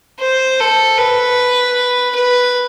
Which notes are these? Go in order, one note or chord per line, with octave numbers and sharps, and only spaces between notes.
C5
A4
B4
B4